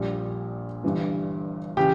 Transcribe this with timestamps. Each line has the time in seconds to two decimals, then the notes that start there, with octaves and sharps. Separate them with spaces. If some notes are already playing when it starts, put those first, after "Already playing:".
Already playing: A#1 A#2 G3
0.83 G1 G2 E3 G3
1.77 C#3 E3 G4